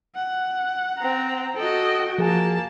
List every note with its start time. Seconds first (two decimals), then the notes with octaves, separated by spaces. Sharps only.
0.15 F#5
0.98 C4 A#5
1.56 F#4 A4 D#5 G5
2.18 F3 A#3 G#4 G#5 A5